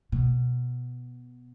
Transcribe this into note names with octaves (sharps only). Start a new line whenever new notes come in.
B2